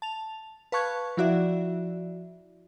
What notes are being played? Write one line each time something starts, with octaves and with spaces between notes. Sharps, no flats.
A5 F7
B4 F5 A5 C#6 F#6 G#6
F3 E4 F#4 D5 E5